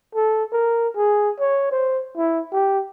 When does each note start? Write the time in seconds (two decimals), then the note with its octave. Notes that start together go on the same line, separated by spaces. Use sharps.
0.15 A4
0.52 A#4
0.96 G#4
1.40 C#5
1.72 C5
2.17 E4
2.53 G4